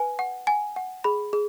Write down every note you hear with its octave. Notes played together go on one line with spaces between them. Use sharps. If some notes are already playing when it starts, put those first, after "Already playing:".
Already playing: B4 G#5
F#5
F#5 G#5
F#5
G#4 B5
G#4